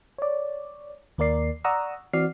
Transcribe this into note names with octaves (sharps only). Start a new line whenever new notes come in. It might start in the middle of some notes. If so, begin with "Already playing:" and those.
C#5 D5
D#2 A#3 A#4 D5 C7
D5 F#5 A#5 C#6 D#6 E6
E3 C4 F#4 D5 F6 C7